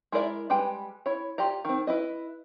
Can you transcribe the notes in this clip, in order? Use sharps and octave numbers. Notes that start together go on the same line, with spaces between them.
G#3 E4 A#4 D5 E5
G3 G#3 B4 G5
E4 C#5
F4 G4 D5 A#5
D#3 C4
E4 B4 D#5